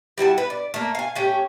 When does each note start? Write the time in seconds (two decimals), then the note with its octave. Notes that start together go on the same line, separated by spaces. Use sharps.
0.18 G3 E4 F#4 A5
0.38 B4
0.50 D5
0.74 A3 A#3
0.95 F5 G#5
1.16 A3 C#4 G4